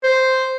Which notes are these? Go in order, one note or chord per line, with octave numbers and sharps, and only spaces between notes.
C5